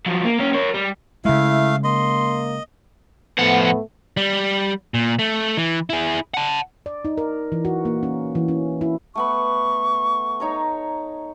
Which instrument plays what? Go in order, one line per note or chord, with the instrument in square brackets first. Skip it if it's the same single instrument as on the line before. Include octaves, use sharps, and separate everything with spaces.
[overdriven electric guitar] F3 F#3
A#3
A#3 C#4
A#4 C#5
G3
[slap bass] C#3 G#3 [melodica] A3 F5 [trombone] E4
[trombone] A#3 [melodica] D#5 [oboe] C6
[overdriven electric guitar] F2 F#5 [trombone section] A2 A3 B3
[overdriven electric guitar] G3
A#2
A3
E3
E4 G#4
F#5 A5
[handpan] D5
D#4
A#4
E3
F#4
A#3
C#4
E3
C#4
E4
[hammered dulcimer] A3 B3 B5 [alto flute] C#6
[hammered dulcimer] D#4 C#5 A#5